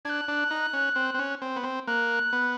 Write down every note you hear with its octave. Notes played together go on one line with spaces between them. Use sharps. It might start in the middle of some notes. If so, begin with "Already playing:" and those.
D4 F#6 G#6
D4
D#4
C#4
C4
C4
C#4
C4
B3
C4
A#3 F#6
B3